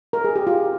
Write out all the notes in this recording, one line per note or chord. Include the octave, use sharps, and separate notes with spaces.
A#4
G#4
G4
F4